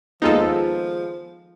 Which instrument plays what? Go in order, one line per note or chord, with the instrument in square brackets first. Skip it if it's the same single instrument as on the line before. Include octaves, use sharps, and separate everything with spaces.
[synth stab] D#2 G#3 B3 [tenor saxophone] F3 [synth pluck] D#4 F4 A4